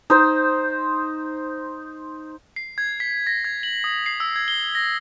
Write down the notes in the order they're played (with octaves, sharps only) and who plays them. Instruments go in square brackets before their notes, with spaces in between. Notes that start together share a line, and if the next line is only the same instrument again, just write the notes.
[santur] D#4 C5
[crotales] C7
G#6
B6
A#6
G#6
F#7
D#6
C7
E6
G#6
G7
A#6